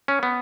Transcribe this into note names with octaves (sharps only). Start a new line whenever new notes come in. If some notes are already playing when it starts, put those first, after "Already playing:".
C#4
B3